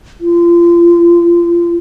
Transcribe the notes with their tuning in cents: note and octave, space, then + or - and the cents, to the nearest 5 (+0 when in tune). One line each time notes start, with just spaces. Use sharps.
F4 -30